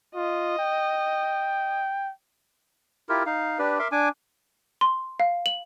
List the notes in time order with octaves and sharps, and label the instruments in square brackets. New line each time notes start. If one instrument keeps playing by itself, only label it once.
[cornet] F4 [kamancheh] D#5
[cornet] G5
[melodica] E4 F4 G4 A#4
D#4 F5
D4 G4 B4 D5
A#4 E5 C6 D6
D4 G#5 D6
[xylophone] C6
F5
F#7